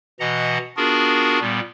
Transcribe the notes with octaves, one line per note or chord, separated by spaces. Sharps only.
B2 E3 D#5 F#5 A#5
B3 D4 F4 F#4 G#4 A#4
A#2 G3 B3